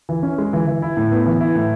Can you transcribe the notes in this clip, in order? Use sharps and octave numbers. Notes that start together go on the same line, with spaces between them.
E3
C#4
G#3
E3
E3
E4
A2
B3
E3
E4
A2